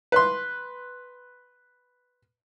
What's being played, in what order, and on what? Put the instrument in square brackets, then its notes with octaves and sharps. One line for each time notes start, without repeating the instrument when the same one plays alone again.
[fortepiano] B4 C6